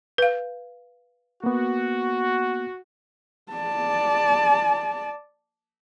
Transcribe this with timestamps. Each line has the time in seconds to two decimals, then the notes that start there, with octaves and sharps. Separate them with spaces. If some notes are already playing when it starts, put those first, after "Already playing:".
0.18 B4 F5
1.44 A#3 B3 F#4
3.52 D5 A5